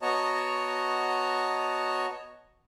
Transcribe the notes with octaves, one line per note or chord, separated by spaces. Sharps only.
B3 F#4 C#5 D#5 A5 A#5